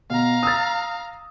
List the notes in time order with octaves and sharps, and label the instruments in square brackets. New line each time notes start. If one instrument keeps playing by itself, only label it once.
[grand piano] B2 [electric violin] F5 A#5
[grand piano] D#6 E6 A6